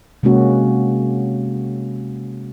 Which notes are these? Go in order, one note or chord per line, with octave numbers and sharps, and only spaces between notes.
C3 G#3 A#3 C#4 F#4